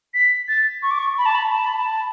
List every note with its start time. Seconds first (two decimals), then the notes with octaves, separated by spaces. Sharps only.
0.14 B6
0.48 A6
0.83 C#6
0.91 D6
0.99 C#6
1.18 B5
1.26 A5
1.35 B5
1.52 A5
1.64 B5
1.77 A5